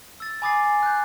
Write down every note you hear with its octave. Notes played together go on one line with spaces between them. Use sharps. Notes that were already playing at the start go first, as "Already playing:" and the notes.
E6 A6
G#5 B5 D6 D#6 A6 C7
G#5
F#6 G6